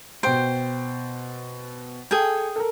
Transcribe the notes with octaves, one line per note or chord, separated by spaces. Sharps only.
B2 C5 G5 D7
G#4 A4 G5 G#5
A4 A#4